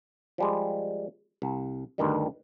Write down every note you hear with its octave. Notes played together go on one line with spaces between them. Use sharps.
F3 G3 G#3
C2
D2 G2 D#3 G3